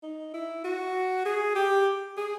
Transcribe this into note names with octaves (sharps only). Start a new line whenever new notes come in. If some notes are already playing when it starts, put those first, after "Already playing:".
D#4
E4
F#4
G#4
G4
G#4